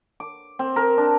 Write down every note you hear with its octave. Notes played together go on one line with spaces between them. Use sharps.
D6
C4
A#4
D4